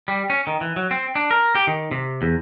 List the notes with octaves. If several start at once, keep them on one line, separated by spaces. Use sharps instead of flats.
G3
C#4
D#3
E3
F#3
C4
D4
A#4
G4
D#3
C3
E2